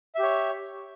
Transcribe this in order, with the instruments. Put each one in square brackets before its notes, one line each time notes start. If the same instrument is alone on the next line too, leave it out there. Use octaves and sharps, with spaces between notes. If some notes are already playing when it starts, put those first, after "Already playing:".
[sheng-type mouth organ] E5
G4
C#5